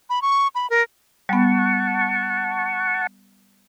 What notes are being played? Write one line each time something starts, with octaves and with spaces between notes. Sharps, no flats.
B5
C#6
B5
A#4
G3 B3 F#5 A5 C#6